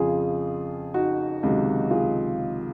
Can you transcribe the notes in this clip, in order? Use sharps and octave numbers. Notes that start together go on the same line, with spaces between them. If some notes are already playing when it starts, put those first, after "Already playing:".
Already playing: F2 C#3 F3 F4 G#4
D#4 F#4
C#2 C3 D#3 F#3
F4 G#4